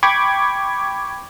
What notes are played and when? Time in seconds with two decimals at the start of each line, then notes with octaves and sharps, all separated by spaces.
0.03 G5 B5 C#6 D6 G#6